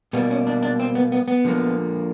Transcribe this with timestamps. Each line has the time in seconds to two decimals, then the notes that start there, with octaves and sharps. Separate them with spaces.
0.13 B2 G3 A#3 B3
0.31 C#4
0.47 D4
0.63 D4
0.80 C4
0.95 B3
1.12 B3
1.28 B3
1.44 D3 F3 A#3